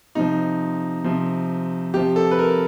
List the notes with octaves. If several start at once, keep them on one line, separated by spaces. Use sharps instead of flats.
C3 F3 D#4
C3 F3
C3 F3 G4
A4
B4
A#4